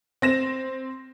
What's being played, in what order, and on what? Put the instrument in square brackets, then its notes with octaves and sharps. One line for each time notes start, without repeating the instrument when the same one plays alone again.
[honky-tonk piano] C4 A#6 E7